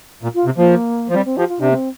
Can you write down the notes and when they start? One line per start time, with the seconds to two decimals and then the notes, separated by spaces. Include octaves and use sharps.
0.23 A#2
0.35 F4
0.45 C3
0.57 F3 A#3
1.09 F3
1.14 G3 C4
1.25 C4
1.37 F3 G4
1.49 F4
1.60 C3 D4
1.71 A#3
1.75 C4